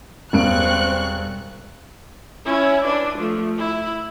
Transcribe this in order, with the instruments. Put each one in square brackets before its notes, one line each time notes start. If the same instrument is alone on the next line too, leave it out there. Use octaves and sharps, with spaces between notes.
[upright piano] E1 G2 D7 [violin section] C4 C#6 F#6
[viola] C#4 E4
D4 B4
F3 A3
E4